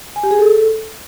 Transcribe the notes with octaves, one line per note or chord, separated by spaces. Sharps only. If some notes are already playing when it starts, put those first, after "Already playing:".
G#5
G4
G#4
A4